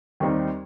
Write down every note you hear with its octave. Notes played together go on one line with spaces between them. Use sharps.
D#2 D#3 G3 C4 D#4